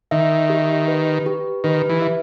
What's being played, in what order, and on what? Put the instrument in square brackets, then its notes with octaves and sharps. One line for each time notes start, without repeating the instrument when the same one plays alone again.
[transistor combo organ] D#3 [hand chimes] E5
[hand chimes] G4
B4
G4
[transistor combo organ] D#3 [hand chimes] B4
[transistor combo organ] E3
[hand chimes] E5